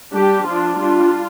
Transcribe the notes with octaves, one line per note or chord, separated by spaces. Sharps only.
G3 D4 G4
F3 D4 F4
G3 D4 F4